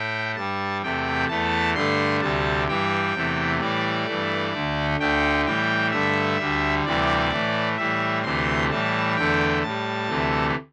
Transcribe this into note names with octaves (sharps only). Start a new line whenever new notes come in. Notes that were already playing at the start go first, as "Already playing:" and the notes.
Already playing: A2 A3 G5
G2 G3 A5
E2 C3 A3 G5
E2 E3 A3 A5
G2 D3 A3 C6
D2 C3 G3 A5
G2 E3 G3 G5
E2 C3 E3 A3
A2 E3 G3 D5
G2 E3 A3
D2 D3 A3
D2 D3 A3 G5
A2 E3 G3 G5
G2 D3 A3 E5
D2 D3 G3
D2 C3 E3 G3 D5
A2 E3 A3
A2 E3 G3 E5
D2 C3 E3 A3 C6
A2 E3 G3 A5
E2 D3 A3 G5
A2 A5
G3
D2 C3 E3 A3